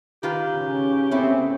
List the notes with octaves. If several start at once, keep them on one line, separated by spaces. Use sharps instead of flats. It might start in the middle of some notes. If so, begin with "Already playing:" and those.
D#3 F4 G4 B4
C#3 C#4
A3 B3 C4 E4